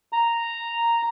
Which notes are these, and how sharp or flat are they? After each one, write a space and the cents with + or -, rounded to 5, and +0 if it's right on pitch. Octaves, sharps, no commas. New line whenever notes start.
A#5 -5